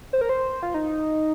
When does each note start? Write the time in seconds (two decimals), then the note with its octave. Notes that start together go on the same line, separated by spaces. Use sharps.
0.13 C5
0.21 A#4
0.29 C5
0.63 F4
0.74 D#4